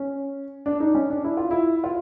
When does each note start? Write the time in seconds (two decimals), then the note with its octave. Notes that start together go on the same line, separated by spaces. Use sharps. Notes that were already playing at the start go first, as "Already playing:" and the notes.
Already playing: C#4
0.66 D4
0.80 D#4
0.95 C#4
1.10 D4
1.24 E4
1.37 F4
1.51 E4
1.84 F4